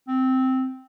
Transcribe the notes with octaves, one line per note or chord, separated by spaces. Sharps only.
C4